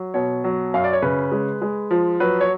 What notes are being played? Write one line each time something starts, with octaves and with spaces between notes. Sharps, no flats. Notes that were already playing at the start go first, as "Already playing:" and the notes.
Already playing: F#3
B2 C#5
F#3
F#2 F5
D5
C#5
C#3 B4
G#3
G#3
F3
F#3 B4
C#5